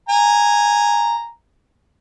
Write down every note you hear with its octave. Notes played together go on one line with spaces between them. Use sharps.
G#5 A#5